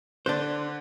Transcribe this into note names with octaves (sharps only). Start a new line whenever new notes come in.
D3 D4 C5 F#6